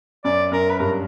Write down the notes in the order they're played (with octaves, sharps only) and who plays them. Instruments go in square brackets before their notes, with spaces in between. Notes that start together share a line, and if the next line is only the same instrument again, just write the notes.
[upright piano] F#2 [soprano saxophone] D5
[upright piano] F#2 [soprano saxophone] A#4
[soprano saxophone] B4
[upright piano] G2 [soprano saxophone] A#4